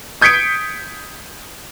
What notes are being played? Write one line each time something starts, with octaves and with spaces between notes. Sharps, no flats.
D#6 G6 G#6 B6 C#7 D7